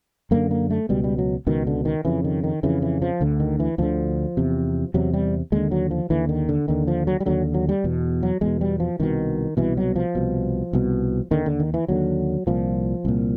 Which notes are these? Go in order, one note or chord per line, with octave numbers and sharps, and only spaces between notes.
F#2 D3 A#3
A#3
A3
C#2 B2 G3
G3
F#3
C#2 B2 D#3
D3
D#3
F2 C#3 E3
D#3
D#3
F2 C#3 E3
E3
F3
D2 D3
D#3
E3
D2 D3 F3
E2 C3
E2 C3 F#3
G3
D#2 D3 G#3
F#3
F3
D#2 D3 E3
D#3
D3
D#2 D3 D#3
F3
F#3
G3
D#2 D3 F#3
F#3
G3
E2 B2
F#3
E2 B2 G#3
G3
F3
C2 B2 D#3
C2 B2 E3
F#3
F3
C2 B2
C2 B2
D#2 D3 D#3
D3
D#3
E3
D#2 D3 F#3
C2 A#2 F3
C2 A#2